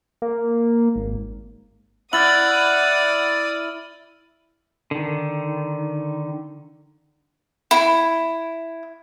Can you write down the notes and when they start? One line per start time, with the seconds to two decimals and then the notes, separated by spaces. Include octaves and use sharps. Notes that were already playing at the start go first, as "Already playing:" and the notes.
0.22 A#3
0.96 G#1
2.13 E4 D5 F#5 D#6 F6 A6 F#7
4.91 D3 D#3
7.71 E4